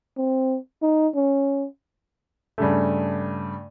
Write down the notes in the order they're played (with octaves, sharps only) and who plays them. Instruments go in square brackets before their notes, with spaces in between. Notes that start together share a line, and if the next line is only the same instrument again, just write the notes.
[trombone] C4
D#4
C#4
[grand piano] G2 C#3 A3